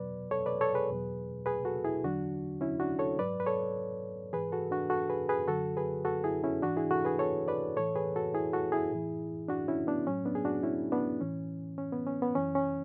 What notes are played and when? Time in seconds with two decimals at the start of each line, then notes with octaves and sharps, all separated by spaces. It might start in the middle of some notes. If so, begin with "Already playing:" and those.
Already playing: E2 B2 F#3 B4 D5
0.31 A4 C#5
0.46 B4 D5
0.61 A4 C#5
0.74 G#4 B4
0.90 E2 B2 F#3
1.46 G#4 B4
1.65 F#4 A4
1.85 E4 G#4
2.04 E2 D3 F#3 D4 F#4
2.61 C#4 E4
2.80 D4 F#4
2.99 A4 C#5
3.19 G#2 F#3 B4 D5
3.40 B4
3.47 A4 C#5
4.33 G#2 E3 G#4 B4
4.52 F#4 A4
4.71 D4 F#4
4.90 F#4 A4
5.10 G#4 B4
5.29 G#4 B4
5.48 F#2 D3 F#3 F#4 A4
5.77 G#4 B4
6.05 F#4 A4
6.24 E4 G#4
6.44 C#4 E4
6.62 G#2 E3 D4 F#4
6.77 E4 G#4
6.91 F#4 A4
7.05 G#4 B4
7.19 A4 C#5
7.48 B4 D5
7.77 A2 E3 A4 C#5
7.96 G#4 B4
8.16 F#4 A4
8.34 E4 G#4
8.53 F#4 A4
8.72 E4 G#4
8.92 A2 E3
9.48 D4 F#4
9.68 C#4 E4
9.87 B3 D4
10.07 A2 F#3 C#4
10.26 B3 D4
10.35 G#4
10.45 D4 F#4
10.63 C#4 E4
10.92 B3 D4
11.20 A2 E3 C#4
11.78 C#4
11.92 B3
12.06 C#4
12.22 B3
12.35 F#2 E3 C#4
12.55 C#4